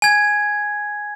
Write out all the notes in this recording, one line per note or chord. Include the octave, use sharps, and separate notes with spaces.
G#5 G#6